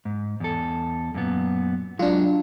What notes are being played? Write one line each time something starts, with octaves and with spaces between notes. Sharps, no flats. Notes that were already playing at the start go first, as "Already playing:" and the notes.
G#2
E2 A4
F#2 A#2 B3
F#3 G#3 D4 F4